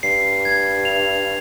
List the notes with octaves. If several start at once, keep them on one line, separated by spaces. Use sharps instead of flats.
G2 C7
G#6
F7